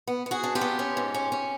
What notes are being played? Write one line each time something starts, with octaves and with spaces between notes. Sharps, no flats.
B3
B3
F#4 G#4
D4
F4 G4
B3
C#4
G#2
C#4
C#4